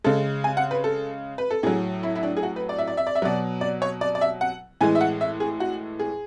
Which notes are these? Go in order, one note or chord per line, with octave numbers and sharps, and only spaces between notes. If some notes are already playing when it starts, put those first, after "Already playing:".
C#3 G#3 A4
G#5
F#5
B4
A4
B4
A4
A2 F#3 G#4
E4
E4
D4
G#4
F#4
B4
D5
E5
D5
E5
D5
E5
B2 F#3 D5
D5
C#5
D5
D5
E5
F#5
A2 E3 G#3 G#5
E5
F#5
E5
G#4
F#4
G#4